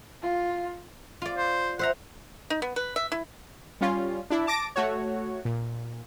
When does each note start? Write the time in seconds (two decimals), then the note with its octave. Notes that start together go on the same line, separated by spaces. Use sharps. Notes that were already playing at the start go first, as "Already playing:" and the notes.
0.22 F4
1.22 F4 D5
1.37 C5
1.79 C5 E5 F#5 A#5
2.50 D#4
2.62 B3
2.76 B4
2.96 E5
3.12 E4
3.81 G3 C#4 F4
4.30 D4 E4
4.47 A5 D6 A#6 D7
4.76 A3 F#4 C#5
5.45 A#2